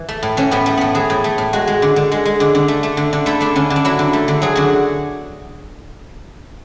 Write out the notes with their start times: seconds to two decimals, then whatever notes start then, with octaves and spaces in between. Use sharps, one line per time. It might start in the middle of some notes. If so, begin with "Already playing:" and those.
Already playing: E3
0.09 A3
0.23 A2
0.37 E3 C#4
0.51 A2 B3
0.66 A3
0.77 A2 B3
0.95 E3 G#4
1.10 A2
1.24 A3
1.38 A2
1.53 G#3 F#4
1.67 G#3
1.82 D3
1.96 D3
2.12 G#3
2.25 G#3
2.40 D3
2.55 D3
2.68 A3
2.83 A3
2.97 D3
3.13 D3
3.26 A3 E4
3.40 A3 D4
3.56 D3 C#4
3.70 D3
3.76 D4
3.85 F#3 E4
3.99 D3
4.13 A3
4.28 D3
4.42 F#3 G#4
4.56 D3 F#4